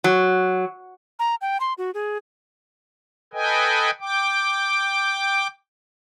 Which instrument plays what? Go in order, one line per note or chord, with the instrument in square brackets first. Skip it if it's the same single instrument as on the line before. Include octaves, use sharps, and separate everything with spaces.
[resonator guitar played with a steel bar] F#3
[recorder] A#5
G5
C6
F#4
G#4
[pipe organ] A4 B4 D#5 G5 G#5
G5 D6